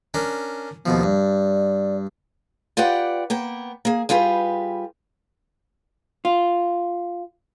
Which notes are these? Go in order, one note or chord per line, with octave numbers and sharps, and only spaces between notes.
C#4 D4 A#4
D#2 B2 F3 B3
G2 D5
F4 G4 B4 D5 F#5 G5
A#3 B3 G5
A#3 G#4
G3 F4 G4 G#4 B4
F4